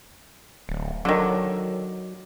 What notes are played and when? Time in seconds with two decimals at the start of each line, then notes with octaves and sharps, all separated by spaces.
0.69 D1
1.05 D3 D#3 F#3